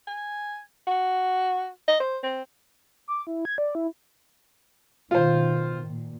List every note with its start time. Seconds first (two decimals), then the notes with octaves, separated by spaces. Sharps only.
0.07 G#5
0.87 F#4
1.88 D#5
2.00 C5
2.23 C4
3.08 D6
3.27 E4
3.45 G#6
3.58 D5
3.75 E4
5.11 B2 D#3 F4 C5
5.87 A#2